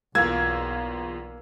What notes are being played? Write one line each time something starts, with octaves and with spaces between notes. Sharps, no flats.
B1 E2 A#3 F4 E6 G#6